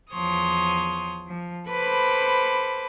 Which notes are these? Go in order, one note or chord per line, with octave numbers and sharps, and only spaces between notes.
E2 F3 C#5 C6 D#6
F3
A4 B4 C5 B5 D6